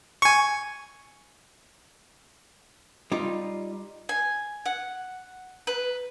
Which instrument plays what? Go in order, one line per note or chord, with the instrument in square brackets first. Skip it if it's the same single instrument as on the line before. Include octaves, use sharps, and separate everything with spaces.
[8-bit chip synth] G#5 C#6
[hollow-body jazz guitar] G3 D#4 F4
[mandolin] G#5
F#5
B4